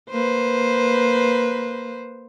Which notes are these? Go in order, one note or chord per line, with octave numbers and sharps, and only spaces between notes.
A#3 B4 C5